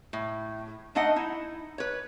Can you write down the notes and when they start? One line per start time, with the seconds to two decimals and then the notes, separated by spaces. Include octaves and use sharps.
0.13 A2
0.95 A3 D4 D#4 D#5 F#5
1.16 D#4 E4
1.78 B4 C#5